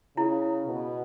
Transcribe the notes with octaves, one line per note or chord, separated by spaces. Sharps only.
C#3 E4
B2